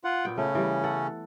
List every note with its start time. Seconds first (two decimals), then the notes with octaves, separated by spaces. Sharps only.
0.04 F4 F#5
0.25 A#2 B3 G5
0.38 C#3 A3 C#4
0.55 E3 G3
0.84 A4 F#5